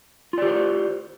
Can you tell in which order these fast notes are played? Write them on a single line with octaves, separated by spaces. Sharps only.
F4 D5 G4 C5